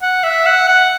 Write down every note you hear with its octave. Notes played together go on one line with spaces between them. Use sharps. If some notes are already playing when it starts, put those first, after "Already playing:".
F#5
E5
F#5
F#5